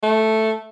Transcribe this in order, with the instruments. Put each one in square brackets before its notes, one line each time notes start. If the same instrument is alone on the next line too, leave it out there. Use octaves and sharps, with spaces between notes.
[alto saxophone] A3